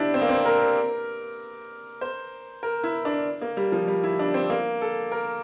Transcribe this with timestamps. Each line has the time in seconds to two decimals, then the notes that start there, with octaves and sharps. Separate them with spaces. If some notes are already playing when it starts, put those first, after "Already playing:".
Already playing: D4 E4 G4
0.14 C4
0.21 A#3
0.29 C4
0.45 A#4
2.01 C5
2.63 A#4
2.84 E4
3.05 D4
3.41 A#3
3.57 G3
3.72 F3
3.88 G3
4.04 E4
4.19 D4
4.34 C4
4.50 A#3
4.82 A4
5.12 A#4